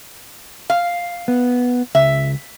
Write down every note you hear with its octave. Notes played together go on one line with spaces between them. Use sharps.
F5
B3
C#2 E5